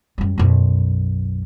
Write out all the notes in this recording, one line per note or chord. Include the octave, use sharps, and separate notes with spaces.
F#2 G3
B1 F#2